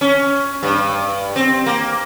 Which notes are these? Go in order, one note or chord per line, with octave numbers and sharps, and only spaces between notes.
C#4
G2
C4
A#3